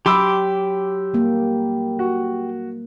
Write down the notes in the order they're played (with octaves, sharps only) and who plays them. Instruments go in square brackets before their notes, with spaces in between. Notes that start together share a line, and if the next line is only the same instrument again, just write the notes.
[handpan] F#3 [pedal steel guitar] G4 C6 D6 [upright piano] B5 E6
[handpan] G3 A#3
[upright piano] F#4